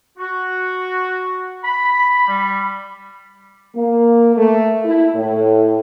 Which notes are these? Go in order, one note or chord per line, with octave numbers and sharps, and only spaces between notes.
F#4
B5
G3
A#3
A3
E4
A2